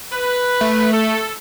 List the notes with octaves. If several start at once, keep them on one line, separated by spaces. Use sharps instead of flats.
B4
A3
A4